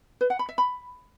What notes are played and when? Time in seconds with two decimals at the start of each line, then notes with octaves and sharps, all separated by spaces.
0.21 B4
0.30 F#5
0.39 B5
0.49 E5
0.58 B5